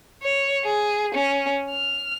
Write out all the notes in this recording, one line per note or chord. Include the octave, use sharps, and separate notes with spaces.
C#5
G#4
C#4
F6